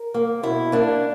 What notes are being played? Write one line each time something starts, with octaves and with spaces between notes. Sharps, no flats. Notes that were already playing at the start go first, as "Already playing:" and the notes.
Already playing: A#4
A#3
B2 E4
A#3 D4